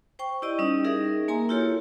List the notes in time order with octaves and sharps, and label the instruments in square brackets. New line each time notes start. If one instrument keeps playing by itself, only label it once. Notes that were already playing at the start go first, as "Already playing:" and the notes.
[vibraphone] C5 G5 C#6
E4 G4 D5 D#5
G3 C#4 D#4 D#5
D#4 G#4 A#4 E5
A#3 G#5 A#5 C6
E4 F4 G4 A4 C#5